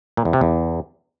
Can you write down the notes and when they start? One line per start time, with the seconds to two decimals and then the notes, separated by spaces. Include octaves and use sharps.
0.17 A#2
0.25 E2
0.33 C3
0.41 E2